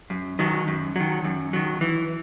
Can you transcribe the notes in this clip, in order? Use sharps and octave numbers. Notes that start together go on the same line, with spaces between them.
F#2
D#3 F#3
F#2
D#3 F#3
F#2
D#3 F#3
E3